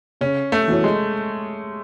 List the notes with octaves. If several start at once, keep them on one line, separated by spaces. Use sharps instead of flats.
C#3 C#4
A3
E3 B3 F#4 C#5
G#3